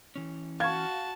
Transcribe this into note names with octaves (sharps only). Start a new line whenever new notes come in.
E3 C#4
F#4 F5 A5 C#6 G#6